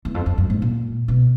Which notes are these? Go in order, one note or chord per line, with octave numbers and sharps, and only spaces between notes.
E2
F2
F2
F#2
G#2
A#2
B2